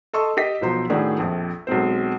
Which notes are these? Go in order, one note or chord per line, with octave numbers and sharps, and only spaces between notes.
A4 D#5 A5 C6 C#6 E6
G4 D#5 B6
B1 B2 F3 C5 A#5 C6
A2 D#3 D4 F#4 G#4
A#1 F2
B1 G#3 C4 C5